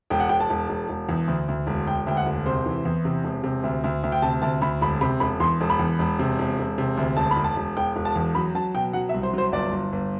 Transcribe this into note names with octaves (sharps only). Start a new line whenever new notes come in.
E1 G5
F#5
E1 G5
A5
E1
E1
E1
E2
D2
D2
E1
E1 G5
D2 G5
F#5
E1
C3 C5
E3
E2
C3
E1
C3
D2
D2
D2
G5
C3 A5
D2 A5
D2 B5
E1 B5
C3 B5
E1 B5
E2 C6
E1
B5
E2
E1
C3
E1
E1
C3
D2
E1 A5
B5
E1
A5
E1
E1 G5
E1
A5
E2
F#3 B5
F#3 A5
B2 G5
F#3 F#5
E5
C2
C5
F#3 C5
G1 D5
G1
G1